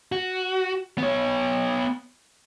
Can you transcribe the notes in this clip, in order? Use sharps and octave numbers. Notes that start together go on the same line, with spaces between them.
F#4
B3 C#5